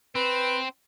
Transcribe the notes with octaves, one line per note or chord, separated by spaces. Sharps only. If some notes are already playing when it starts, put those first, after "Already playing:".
C4 B4